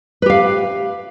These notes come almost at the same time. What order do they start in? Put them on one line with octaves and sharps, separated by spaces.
B4 G4 F5